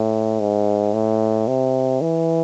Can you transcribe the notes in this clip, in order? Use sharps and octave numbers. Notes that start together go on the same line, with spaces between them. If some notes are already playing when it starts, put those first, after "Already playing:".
Already playing: A2
G#2
A2
C3
E3